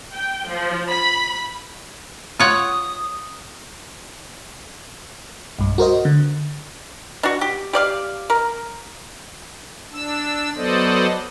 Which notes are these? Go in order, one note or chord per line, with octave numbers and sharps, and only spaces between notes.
G5
F3
B5
F4 C#5 F#5 D#6
B1 G2
F#4 A#4 C5 D#5
D3
D4 F#4
G4
G4 D5 F5
A#4
D4 E6
F#3 B3 A4 C5 D5 D#5